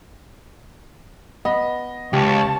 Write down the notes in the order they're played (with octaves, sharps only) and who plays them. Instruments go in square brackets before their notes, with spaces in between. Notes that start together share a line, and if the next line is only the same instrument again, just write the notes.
[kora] B3 [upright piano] D#5
[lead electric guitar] C#2 [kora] G4 [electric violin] C#5 A5